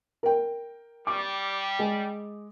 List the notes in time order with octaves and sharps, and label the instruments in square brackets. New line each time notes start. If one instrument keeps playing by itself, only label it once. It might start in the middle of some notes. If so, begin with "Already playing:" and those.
[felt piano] A#4 G5
[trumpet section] G3 [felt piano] D6
[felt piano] G#3